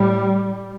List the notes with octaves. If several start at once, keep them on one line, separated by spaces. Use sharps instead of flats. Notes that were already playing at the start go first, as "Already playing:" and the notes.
Already playing: A2 G3